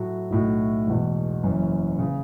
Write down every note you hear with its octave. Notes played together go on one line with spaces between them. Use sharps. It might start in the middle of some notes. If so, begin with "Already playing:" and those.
Already playing: A2 F#3 A3 F#4
B1 A2 A3 F#4
E1 E2 B2
F#1 F#2 E3 C#4
C#3